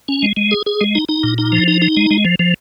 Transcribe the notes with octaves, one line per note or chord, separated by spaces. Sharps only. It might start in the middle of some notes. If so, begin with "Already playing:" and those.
C#4
G#3
G#3
G#4
G#4
G#3
D#4
D#4
A#2
D#4
F3
D#4
D#4
G#3
G#3
F3
F3